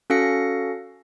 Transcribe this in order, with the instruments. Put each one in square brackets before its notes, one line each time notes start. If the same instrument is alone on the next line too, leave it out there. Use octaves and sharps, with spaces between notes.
[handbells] C#4 F#4 A4 F5 A#6 C#7